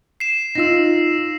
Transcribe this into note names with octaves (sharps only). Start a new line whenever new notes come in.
C7 E7
D#4 F4 E6 A#6